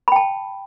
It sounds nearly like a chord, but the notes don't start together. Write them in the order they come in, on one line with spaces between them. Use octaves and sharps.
B5 G5 A5